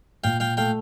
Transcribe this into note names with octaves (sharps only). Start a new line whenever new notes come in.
A#2 F5 G5
F5 G5
A3 F5 G5